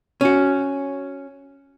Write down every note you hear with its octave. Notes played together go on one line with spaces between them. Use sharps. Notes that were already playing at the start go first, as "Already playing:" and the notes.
C#4 F#4